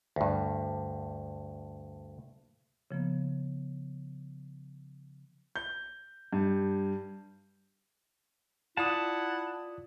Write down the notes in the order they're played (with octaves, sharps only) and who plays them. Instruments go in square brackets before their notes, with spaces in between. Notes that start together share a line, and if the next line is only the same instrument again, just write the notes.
[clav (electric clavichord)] D2 G2
[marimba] C#3 F3 A#3 B3
[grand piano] G6
G2
[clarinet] E4 [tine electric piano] F4 D5 D#6 [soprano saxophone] F#5 [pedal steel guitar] A5